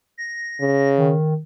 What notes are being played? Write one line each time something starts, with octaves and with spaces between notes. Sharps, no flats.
A#6
C#3
D#3